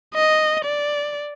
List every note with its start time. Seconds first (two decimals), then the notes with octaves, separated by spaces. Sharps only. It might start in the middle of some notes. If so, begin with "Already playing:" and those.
0.15 D#5
0.65 D5